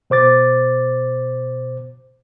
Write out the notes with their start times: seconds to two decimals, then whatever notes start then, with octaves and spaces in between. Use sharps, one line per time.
0.10 B2 C5 D6 A6